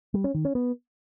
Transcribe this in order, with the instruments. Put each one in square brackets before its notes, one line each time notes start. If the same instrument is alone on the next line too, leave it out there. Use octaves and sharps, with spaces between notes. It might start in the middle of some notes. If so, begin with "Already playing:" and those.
[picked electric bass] G3
C#4
D#3
C#4
B3